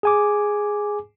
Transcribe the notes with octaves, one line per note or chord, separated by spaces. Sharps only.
G#4 G#5 D6